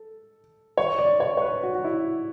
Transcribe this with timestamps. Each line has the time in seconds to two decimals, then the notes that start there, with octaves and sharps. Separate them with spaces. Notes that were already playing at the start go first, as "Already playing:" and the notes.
Already playing: A4
0.78 C#5
0.99 D5
1.20 C#5
1.37 C#5
1.42 B4
1.63 F#4
1.75 F#4
1.85 E4